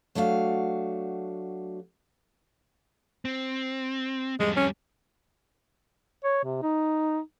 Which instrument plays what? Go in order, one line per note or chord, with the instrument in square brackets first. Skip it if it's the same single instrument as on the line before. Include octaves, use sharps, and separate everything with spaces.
[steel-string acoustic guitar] F#3 A3 D4 F#4 F5
[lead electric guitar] C4
[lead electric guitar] F2 G3 [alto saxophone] G#3
[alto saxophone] C#4
[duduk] C#5
C3
D#4